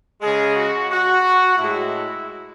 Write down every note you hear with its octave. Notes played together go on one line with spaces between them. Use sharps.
C#3 G#3 G#4
F#4
F#4
A2 G#3 E4